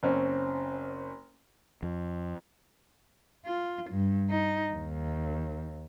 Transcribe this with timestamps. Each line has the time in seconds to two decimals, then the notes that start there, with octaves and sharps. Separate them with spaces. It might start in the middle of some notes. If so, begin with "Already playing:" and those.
0.03 F#1 C4 C#4
1.83 F2
3.45 F4
3.91 G2
4.30 D#4
4.73 D#2